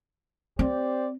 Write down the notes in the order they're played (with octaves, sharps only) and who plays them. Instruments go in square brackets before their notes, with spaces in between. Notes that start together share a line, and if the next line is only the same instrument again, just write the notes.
[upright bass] C4 [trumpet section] G4 C5 D5